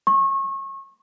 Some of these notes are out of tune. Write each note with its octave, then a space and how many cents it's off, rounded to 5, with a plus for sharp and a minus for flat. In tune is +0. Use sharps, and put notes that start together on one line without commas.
C#6 -30